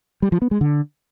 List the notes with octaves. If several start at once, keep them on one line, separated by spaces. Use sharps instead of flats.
G3
F3
B3
G#3
D3